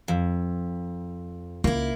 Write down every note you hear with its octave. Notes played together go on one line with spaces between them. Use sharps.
F2
C#2 A#3 E4